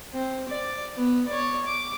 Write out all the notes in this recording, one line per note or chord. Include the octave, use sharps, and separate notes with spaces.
C4
D5
B3
C#5 D5
D6